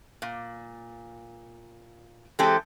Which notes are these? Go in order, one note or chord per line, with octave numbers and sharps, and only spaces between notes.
A#2
E3 G#3 C4 G4 A4